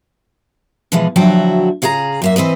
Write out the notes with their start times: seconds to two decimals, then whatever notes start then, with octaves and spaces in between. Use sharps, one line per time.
0.92 B2 E3 F3 G#3
1.16 D2 F3 F#3 E4 F#4 G5
1.82 C#3 F4 G#4 E5 A#5
2.22 F#2 A#3 E5
2.36 E3 C4 B4 D#5